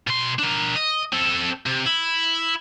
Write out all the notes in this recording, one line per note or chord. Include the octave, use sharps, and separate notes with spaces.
B2 C6
D4 A#4
D#5
C4 A4
C3
E4